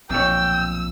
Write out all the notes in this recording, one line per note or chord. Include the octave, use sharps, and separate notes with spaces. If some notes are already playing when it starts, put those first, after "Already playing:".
B1 F2 A#2 C#5 G5 E6